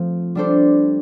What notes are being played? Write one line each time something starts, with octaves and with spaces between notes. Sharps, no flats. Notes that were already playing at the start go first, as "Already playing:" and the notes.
Already playing: F3 A3 C4 F4
G3 D4 A4 C5